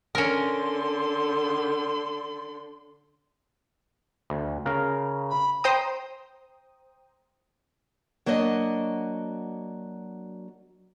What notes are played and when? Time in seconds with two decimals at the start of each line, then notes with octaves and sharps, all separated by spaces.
0.15 D3 C#4 A#4 C6
4.30 D2
4.65 C#3 A#4 F5
5.30 B5
5.64 C5 G5 A#5 D#6
8.26 F#3 A#3 D4 F#4 D#5